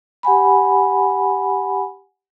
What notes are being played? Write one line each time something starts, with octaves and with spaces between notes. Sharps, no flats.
G4 F#5 G#5 B5